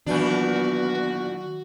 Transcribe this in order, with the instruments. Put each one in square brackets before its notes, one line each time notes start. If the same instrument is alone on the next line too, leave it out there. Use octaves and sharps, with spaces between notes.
[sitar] A#2 E3 D4 [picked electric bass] D#3 F#3 [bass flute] B3 [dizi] F#4